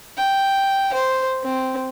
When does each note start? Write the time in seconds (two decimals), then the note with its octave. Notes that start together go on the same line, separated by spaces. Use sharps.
0.17 G5
0.93 C5
1.43 C4